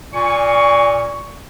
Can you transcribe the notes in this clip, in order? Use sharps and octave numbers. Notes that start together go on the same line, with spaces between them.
A#2 G#5 C#6